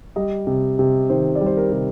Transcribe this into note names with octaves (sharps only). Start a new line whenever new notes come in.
G3 D#5
C3
C3
D#3 C5
D5
G3 C5
A#4
C3